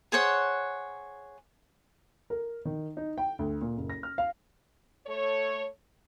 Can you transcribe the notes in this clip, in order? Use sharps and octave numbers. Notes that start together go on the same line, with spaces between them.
G#4 C5 C#5 F#5
A#4
D#3
D#4
G5
D2
A#2
F#1
A#6
F6
F5
A3 A4 C#5